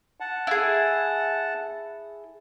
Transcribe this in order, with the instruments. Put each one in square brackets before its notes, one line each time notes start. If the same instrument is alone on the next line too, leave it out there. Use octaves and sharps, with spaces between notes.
[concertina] F#5 A5
[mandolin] E4 G#4